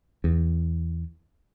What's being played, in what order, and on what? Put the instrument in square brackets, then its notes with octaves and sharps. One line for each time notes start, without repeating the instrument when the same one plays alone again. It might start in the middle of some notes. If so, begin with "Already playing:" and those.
[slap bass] E2